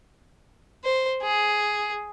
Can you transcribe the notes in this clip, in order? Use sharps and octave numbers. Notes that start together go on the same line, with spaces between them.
C5
G#4